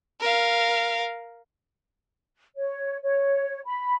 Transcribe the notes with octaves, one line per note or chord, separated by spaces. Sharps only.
A#4 F5
C#5
C#5
B5